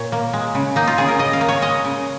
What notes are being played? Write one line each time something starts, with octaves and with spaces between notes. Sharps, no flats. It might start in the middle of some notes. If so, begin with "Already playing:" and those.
Already playing: A#2 C#5
A#3
G#3
C#3
A#3 D#4
F4
C#3 G#4
A#4
C#3 D#5
F5
A#3
C#5
G#3 D#5
C#3